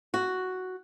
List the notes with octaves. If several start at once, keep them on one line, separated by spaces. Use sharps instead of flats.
F#4